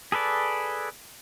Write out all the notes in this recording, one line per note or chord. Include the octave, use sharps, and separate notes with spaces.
G#4 A4 B4 D5